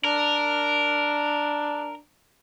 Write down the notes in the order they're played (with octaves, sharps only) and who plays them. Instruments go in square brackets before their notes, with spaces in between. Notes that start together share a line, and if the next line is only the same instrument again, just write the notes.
[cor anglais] D4 [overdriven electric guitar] A#4